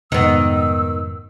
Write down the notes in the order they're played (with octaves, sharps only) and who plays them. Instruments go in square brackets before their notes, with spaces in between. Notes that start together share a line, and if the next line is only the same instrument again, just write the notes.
[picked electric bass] F1 G#2 [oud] D#3 B3 [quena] E6